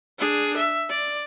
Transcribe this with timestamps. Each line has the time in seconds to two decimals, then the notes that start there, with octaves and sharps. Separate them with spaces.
0.19 D4 G#4
0.57 E5
0.90 D5